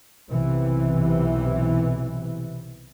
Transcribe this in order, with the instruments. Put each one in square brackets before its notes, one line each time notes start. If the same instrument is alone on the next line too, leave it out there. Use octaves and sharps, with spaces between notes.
[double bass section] B1 C3 E3